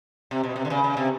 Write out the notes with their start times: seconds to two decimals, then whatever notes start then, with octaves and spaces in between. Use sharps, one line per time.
0.31 C3
0.43 B2
0.56 C3
0.65 D3
0.70 C#3
0.84 C#3
0.97 C3